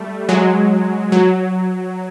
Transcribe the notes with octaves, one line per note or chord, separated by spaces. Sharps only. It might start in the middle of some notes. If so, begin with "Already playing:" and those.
Already playing: G3 A3
F#3 G#3
F#3